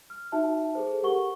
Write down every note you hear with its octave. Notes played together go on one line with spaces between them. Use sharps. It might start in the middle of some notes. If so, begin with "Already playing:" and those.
F6
D#4 F#4 E5 A5
G#4 A4 C5
G4 A#4 F#5 C#6 G7